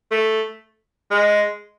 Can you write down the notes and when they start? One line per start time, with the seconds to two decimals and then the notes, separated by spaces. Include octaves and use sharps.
0.11 A3
1.11 G#3